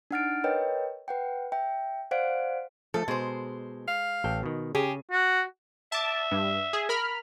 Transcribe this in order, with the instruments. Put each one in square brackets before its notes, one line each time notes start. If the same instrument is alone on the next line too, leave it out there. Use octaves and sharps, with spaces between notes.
[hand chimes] D4 D#4 F#5 F6 A6 D7
A#4 B4 C#5 D#5 G5
B4 F#5 G5
E5 G5
C5 D5 F5 F#5 D7
[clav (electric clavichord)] F3 A3 [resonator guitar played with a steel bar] A4
[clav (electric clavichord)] B2 [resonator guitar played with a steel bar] G#3 C5
[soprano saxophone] F5
[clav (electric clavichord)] A1 A4 G5
B2 D#3
[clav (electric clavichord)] C#3 [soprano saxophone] G4 [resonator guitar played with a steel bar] G#4
[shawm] F#4
[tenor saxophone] E5 [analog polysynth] A5 D6
[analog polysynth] G2
G#4
A#4 B5 F6